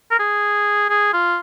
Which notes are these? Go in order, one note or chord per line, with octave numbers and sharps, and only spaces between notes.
A#4
G#4
G#4
F4